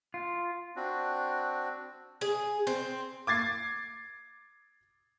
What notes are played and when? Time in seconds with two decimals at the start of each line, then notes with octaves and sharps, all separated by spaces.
0.14 F4
0.76 C4 D4 F#4
2.21 G#4
2.67 C4
3.27 D6 G#6 A6 C7